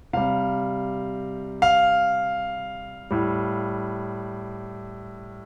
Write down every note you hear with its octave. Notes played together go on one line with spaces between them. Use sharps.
C3 G3 F5
F5
A2 G3